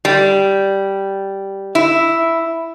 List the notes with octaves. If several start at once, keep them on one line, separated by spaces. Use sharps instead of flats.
G3
E4